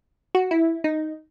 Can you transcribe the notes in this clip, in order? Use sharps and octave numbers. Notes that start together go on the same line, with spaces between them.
F#4
E4
D#4